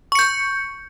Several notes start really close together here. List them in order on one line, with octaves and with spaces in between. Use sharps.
C#6 C#7 G6